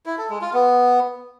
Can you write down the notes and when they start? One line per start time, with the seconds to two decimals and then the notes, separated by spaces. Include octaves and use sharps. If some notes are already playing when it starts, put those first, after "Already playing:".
0.06 E4
0.18 A4
0.30 G#3
0.42 F4
0.53 B3